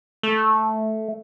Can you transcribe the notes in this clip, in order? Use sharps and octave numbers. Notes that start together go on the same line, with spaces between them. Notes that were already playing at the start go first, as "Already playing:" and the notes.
A3